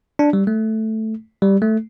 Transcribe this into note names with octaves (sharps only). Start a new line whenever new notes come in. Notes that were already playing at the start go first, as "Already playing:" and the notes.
D4
G3
A3
G3
A3